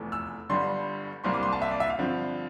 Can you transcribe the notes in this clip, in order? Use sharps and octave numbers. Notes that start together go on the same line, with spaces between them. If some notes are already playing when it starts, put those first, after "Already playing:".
Already playing: F1 E2 E3 A3
E6
G1 G2 D3 G3 C6
C2 C3 G3 A#3 C6
D6
C6
A5
E5
D5
E5
F5
G2 D3 F3 C4